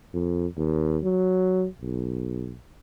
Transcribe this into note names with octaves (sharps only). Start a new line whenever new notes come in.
F2
D#2
F#3
B1